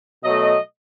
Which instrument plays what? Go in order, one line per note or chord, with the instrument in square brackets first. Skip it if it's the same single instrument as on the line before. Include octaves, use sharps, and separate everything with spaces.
[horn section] B2 F#3 A3 D#5